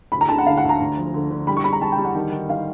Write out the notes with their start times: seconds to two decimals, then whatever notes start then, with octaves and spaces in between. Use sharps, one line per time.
0.12 D2 B5
0.21 A#5
0.29 D3 A5
0.38 F#5
0.46 D3 F5
0.58 F#5
0.63 D2
0.69 A#5
0.80 D2
0.97 F3
1.14 D3
1.31 D3
1.47 G3 B5
1.57 C#6
1.64 G3 B5
1.73 A#5
1.81 G3 A5
1.92 G5
1.98 G3
2.05 F#5
2.15 D#3
2.32 D#3
2.49 D#3 F5